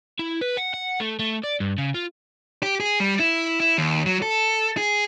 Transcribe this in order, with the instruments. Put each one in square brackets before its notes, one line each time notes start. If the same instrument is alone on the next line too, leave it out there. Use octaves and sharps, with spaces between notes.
[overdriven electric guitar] E4
B4
F#5
F#5
A3
A3
D5
G2
C#3
F4
[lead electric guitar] G4
G#4
G3
E4
E4
D#2
F#3
A4
G#4